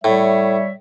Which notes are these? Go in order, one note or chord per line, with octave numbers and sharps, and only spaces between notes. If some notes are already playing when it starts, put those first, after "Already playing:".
A2 G3 C#5 E5